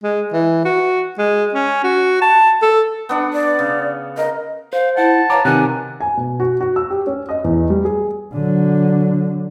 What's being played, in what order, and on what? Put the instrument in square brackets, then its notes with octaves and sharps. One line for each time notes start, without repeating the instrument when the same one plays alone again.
[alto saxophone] G#3
E3
F#4
G#3
C#4
F#4
A5
A4
[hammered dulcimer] B3 D4 F#5
[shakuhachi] D5
[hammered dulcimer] C#3
[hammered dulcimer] A#4 [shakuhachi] D#5
[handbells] C5 [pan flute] F5
[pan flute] E4 [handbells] F#5 [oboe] A5
[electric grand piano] B4 F5 D6 [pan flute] C#5 [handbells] A#5
[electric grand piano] C3 D#3 [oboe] F#5 [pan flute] G#5
[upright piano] G#5
B2
F#4
F#4
E6
G4
C#4
D#5
E2
G3
G#4
[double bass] D3 F#3